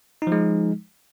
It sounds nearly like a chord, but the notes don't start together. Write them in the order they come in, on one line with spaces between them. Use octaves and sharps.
D#4 F3 G#3